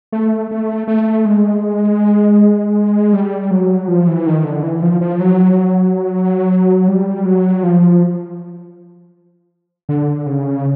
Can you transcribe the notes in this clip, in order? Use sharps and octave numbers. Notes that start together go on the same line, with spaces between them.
A3
A3
A3
G#3
G3
F#3
F3
E3
D#3
D3
E3
F3
F3
F#3
G3
F#3
F3
D3
C#3